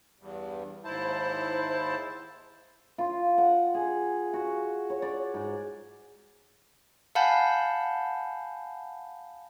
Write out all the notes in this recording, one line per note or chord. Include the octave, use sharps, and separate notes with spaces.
E2 G2
D#2 G#2 E4 C5 A5
F4
F#5
G#4
F#4
C#5
D5
G#2
F5 F#5 G#5 A5 B5 G6